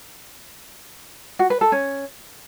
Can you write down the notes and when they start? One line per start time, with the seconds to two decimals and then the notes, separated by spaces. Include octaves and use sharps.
1.39 F#4
1.50 B4
1.61 A4
1.72 C#4